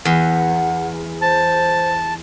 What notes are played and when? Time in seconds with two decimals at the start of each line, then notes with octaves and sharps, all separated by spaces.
0.05 E2 F#5
1.21 C5 A5